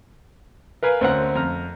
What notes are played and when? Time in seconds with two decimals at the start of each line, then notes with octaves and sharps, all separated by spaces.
0.83 A#4 B4 F5 G#5
1.01 D2 C4 C#4 A#4 F#5 F#6
1.35 F2 A#5 F6